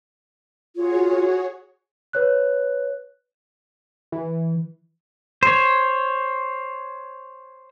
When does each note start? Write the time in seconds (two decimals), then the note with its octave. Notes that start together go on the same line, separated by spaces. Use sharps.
0.76 F4 F#4 G#4 C#5
2.13 B4 C#5 F#6
4.12 E3
5.43 C5 C#5